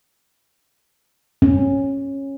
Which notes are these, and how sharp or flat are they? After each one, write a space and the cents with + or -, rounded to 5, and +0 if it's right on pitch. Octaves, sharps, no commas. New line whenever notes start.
C#4 -15